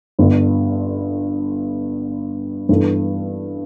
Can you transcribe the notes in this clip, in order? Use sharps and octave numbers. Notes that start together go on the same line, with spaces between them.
G1 G2 D3
G2 E3 B3 E4 A4